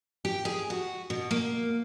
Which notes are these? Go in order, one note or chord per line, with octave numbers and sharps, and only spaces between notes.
G4
G#4
F#4
B2
A#3